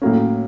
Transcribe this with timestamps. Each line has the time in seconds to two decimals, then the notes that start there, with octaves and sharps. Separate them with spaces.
0.02 A2 F#3 A#3 C#4